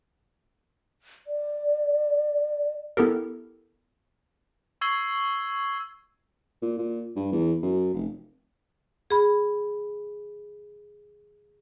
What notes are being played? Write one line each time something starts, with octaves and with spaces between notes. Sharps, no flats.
D5
B3 E4 G4 A4 A#4
C#6 E6 G#6 C7 F#7 G7
A#2
A#2
G2
E2
F#2
F1
G#4 B5